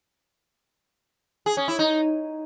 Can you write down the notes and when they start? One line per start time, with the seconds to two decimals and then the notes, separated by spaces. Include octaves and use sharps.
1.46 G#4
1.57 C#4
1.68 E4
1.79 D#4